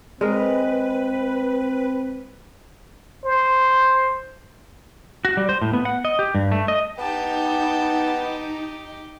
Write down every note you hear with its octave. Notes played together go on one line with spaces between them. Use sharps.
G#3 C4 A#4 B4
C5
F#4
G3
C5
A2
B3
F#5
D#5
G4
G2
A3
D#5
B3 D#4 G4 A5 G6